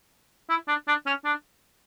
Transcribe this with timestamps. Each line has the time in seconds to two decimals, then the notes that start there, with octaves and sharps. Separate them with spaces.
0.49 E4
0.68 D4
0.88 D4
1.06 C#4
1.25 D4